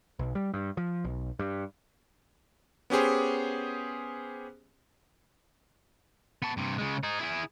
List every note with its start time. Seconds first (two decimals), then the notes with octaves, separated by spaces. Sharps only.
0.19 B1
0.35 G3
0.54 G2
0.77 F3
1.04 B1
1.39 G2
2.90 B3 C#4 G4 G#4 C5
6.42 B3 A5
6.57 G2 C3
6.78 C#3 G#3
7.03 D#4 G#4
7.20 E4 G#4